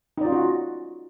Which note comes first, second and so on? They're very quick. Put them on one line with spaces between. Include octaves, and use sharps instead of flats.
D#4 D5 F4 C#4 F#4